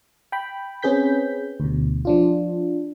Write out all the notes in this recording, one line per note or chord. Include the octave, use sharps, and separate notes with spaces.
G5 B5
C4 C#4 G#4 B4 G6 B6
D2 B2
F3 D4 F4